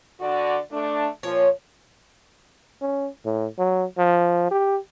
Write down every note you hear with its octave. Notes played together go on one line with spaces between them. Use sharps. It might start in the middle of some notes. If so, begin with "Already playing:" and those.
D3 F#4 D5
A3 D4
A#2 F3 C#5
C#4
A2
F#3
F3
G4